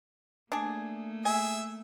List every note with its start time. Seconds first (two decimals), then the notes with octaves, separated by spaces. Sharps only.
0.52 A3 A#3 D4 G#4
1.25 G#4 E5 G#5